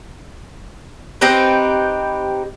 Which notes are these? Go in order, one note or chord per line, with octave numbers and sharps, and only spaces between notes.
C4 D#4 G4 B4